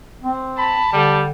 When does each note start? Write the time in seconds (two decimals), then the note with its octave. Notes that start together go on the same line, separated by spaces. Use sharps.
0.24 C4
0.58 A5 B5
0.93 D3 G3